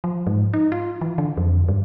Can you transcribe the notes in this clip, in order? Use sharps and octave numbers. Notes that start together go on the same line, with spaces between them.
F3
G#2
D#4
F4
E3
D3
F2
G2